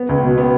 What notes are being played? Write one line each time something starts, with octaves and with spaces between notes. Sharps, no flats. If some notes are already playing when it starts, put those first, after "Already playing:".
Already playing: B3
C#2
B2
B3